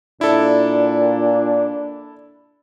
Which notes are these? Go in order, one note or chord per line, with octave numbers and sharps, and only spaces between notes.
A#2 D4 E4 A4